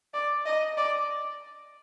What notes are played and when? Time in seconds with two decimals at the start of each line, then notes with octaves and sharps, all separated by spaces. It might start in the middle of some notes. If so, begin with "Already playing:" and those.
0.14 D5
0.46 D#5
0.77 D5